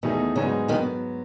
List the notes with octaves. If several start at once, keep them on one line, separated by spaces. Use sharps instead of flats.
E2 B2 D#3 A3 D#4 G#4
G#2 C#3 F#3 B3 D#4 G#4
B2 D#3 F#3 B3